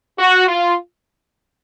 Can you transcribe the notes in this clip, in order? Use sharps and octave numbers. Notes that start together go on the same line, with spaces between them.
F#4
F4